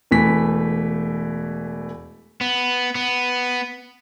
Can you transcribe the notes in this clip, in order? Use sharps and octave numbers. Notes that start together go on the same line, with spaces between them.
E1 E3 A3 B6
B3
B3